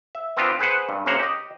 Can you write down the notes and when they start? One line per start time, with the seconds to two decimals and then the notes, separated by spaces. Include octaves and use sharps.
0.15 E5
0.37 B3 C4 D4 F4 G4
0.59 G#4 B4 C5 F#5
0.89 G2
1.06 F#2 C#3 A#3 C5 F#5 A#5
1.19 G4 D#5